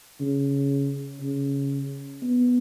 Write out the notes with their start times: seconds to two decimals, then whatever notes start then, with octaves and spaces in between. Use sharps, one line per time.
0.21 C#3
1.21 C#3
2.22 B3